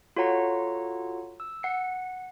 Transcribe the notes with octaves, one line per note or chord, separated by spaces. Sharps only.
F4 F#4 A4 C#5 F#5 A#5
E6
F#5 C7 C#7